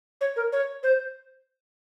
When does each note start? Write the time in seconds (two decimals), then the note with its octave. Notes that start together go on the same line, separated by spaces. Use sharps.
0.21 C#5
0.36 A#4
0.52 C#5
0.83 C5